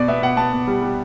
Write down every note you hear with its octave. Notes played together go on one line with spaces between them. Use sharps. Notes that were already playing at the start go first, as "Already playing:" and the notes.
Already playing: B2 D5
B3 E5
B2 F#5
B3 A5
B3
G3
G3